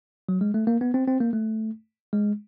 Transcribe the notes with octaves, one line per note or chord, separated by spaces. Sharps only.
F#3
G#3
A3
A#3
B3
C4
C4
A#3
A3
G#3